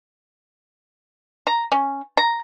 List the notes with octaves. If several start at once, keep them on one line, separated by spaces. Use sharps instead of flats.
A#5
C#4
A#5